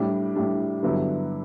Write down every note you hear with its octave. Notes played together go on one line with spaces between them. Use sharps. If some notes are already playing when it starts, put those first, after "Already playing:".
Already playing: A2 G3 D4
A2 G3 D4
G2 D3 F#3 B3 E4